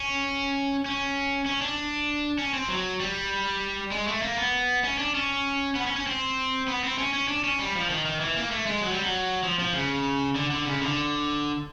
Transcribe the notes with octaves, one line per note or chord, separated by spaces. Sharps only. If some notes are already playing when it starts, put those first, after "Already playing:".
Already playing: C#4
C#4
C#4
D4
C#4
C4
F#3
G3
G#3
A3
A#3
B3
C#4
D4
C#4
B3
C#4
C#4
C4
B3
C4
C#4
C#4
D4
C#4
G3
F3
D#3
D#3
E3
A#3
A3
G#3
F#3
G3
F#3
F3
F3
C#3
D3
D3
C#3
D3